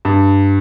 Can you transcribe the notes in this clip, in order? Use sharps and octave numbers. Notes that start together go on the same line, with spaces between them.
G2